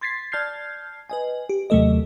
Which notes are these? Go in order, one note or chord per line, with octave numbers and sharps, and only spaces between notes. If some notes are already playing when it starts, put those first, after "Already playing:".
C6 G#6 A6 B6 C7
D5 A5 F6 G6 G#6 C7
B4 D#5 G#5
G4
D#2 C3 F#3 A3 A4 D#5